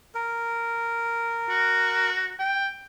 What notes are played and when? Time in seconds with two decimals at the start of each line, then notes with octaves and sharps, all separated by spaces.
0.15 A#4
1.49 F#4
2.39 G5